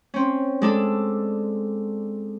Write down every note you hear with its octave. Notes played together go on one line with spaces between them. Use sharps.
C4 C#4
G#3 D4 A4